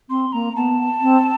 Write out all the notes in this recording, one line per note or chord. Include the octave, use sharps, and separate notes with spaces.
C4 C6
A#3 A#5
B3 A5
C4